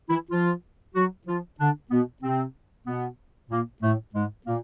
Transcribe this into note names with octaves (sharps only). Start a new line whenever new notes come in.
E3 E4
F3 F4
F#3 F#4
F3 F4
D3 D4
B2 B3
C3 C4
B2 B3
A#2 A#3
A2 A3
G#2 G#3
A#2 A#3